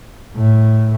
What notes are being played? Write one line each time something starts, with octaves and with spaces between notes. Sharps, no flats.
A2